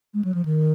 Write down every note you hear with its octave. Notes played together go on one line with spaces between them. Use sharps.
G#3
F#3
F3
D#3